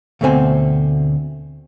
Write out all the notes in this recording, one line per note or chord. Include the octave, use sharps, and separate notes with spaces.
D2 B2 A3 C4 G#5